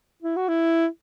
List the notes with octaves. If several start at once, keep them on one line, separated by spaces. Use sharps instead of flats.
E4
F#4
E4